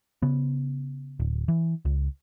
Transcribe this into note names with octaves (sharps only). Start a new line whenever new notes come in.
C#3 B3
D1
E3
C#2